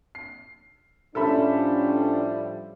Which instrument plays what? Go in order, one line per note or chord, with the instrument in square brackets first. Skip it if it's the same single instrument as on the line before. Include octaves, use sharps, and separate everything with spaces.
[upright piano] C7
[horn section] A2 F3 G3 [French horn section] C#4 D4 [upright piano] A4 E5 B5